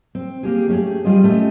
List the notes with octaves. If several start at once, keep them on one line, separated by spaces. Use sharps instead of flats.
C4
A#3 G4 G#4
A3 C#4 D#4 G4 G#4
G3 F4 G4 G#4 C5 D#5
A3 B3 C#4 G4 C#5 D#5